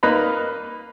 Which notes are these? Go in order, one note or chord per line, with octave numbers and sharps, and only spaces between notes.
A#3 D#4 B4 A#5 B5